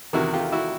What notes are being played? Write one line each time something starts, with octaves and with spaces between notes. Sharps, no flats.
E2 C3 D#3 E4 F#4
F4 G4
E4 F#4